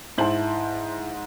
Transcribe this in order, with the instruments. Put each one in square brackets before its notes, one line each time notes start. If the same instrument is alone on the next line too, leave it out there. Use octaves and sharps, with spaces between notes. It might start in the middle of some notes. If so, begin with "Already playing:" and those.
[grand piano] G#2 C5 F#7 [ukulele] E4 A5